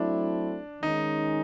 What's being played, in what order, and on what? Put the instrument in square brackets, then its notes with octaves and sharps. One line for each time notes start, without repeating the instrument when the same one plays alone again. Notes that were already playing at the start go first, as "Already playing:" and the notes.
Already playing: [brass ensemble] F#3 A3 C4 E4 [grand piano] D4
[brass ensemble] D#3 G#3 C#4 [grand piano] D#4